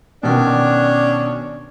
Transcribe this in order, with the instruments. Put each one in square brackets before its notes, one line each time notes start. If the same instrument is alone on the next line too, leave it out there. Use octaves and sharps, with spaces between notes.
[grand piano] B2 D#3 [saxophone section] C#4 D4